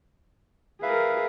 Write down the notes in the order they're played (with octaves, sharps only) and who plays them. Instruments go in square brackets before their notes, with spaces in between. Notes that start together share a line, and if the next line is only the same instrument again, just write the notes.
[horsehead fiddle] G#4 A#4 [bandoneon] B4 E5 F5